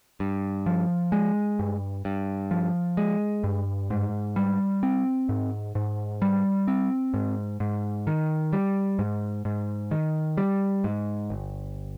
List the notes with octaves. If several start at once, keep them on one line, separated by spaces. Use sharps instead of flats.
G2
F3
G#3
G2
G2
F3
G#3
G2
G#2
G3
C4
G#2
G#2
G3
C4
G#2
G#2
D#3
G3
G#2
G#2
D#3
G3
G#2
G1